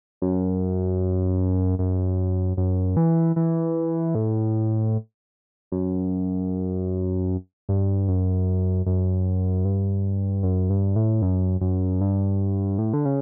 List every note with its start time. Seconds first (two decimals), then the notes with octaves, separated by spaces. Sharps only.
0.22 F#2
1.79 F#2
2.57 F#2
2.97 E3
3.36 E3
4.15 A2
5.72 F#2
7.69 G2
8.08 F#2
8.86 F#2
9.65 G2
10.43 F#2
10.70 G2
10.96 A2
11.22 F#2
11.61 F#2
12.01 G2
12.79 A2
12.94 D3
13.05 C#3